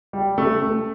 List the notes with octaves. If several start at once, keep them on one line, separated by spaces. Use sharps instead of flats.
G3
A3
A3